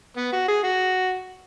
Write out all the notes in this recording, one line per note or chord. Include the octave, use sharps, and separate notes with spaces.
B3
F#4
G#4
F#4